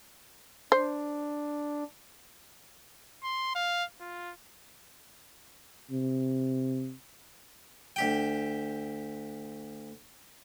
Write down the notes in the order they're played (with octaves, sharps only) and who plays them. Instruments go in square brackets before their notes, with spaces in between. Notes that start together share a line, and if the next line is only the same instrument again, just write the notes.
[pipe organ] D4 [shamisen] C5
[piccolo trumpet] C6
F5
F4
[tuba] C3
[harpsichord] D2 G4 G5